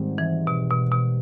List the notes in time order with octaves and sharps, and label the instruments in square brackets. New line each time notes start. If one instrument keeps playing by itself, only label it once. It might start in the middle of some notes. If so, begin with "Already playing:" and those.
Already playing: [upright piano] G#2 D#3 G3 C4
[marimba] E3
B2
B2
B2